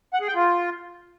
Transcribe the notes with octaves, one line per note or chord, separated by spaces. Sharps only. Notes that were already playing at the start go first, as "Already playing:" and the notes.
F#5
G#4
G5
F4